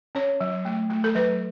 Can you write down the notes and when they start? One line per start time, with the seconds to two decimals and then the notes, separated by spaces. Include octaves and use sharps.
0.15 C#4 C#5
0.40 F#3
0.65 A3
0.90 A3
1.04 A4
1.15 F#3 B4